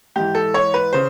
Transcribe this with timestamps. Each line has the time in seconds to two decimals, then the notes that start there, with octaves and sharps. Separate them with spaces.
0.16 G#2 E3 G4
0.35 A4
0.54 C#5
0.74 B4
0.93 C#3 C5